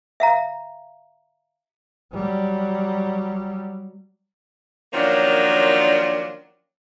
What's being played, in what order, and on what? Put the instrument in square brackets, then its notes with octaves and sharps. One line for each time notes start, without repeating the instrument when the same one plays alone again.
[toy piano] E5 F5 A#5
[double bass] F#3 G3
[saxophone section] D#3 F3 F#3 A#3 C#4 D4